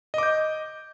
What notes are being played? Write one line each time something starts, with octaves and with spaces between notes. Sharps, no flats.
D#5 D6 G6